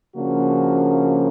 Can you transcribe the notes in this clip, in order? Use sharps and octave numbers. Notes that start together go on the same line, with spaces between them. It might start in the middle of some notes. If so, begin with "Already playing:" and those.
C#3 F3 A#3 D4 F#4